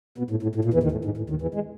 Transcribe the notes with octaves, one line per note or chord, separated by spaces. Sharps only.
B2
A2
A2
A2
A#2
E2 E3
D#2 D#3
A2
G#2
A2
D#2 D#3
E2 E3
G#3